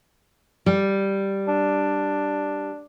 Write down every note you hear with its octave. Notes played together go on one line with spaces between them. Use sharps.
G3
D4